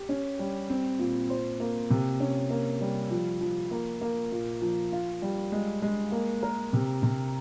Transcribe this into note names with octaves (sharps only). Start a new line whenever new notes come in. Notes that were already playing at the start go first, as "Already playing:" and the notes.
Already playing: G4
C#4
G3
C4
A#2
C5
A#3
C3
C#4
A#3
G3
F3
F3
A#3
A#3
A#2
F3
F4
G3
G#3
G#3
A#3
A#4
C3
C3